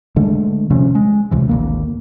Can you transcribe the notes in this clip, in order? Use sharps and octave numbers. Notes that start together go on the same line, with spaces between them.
D3 G#3 A3
C3 F3 C#4
G#3
C#2 C3 E3
G#1 D2 A#3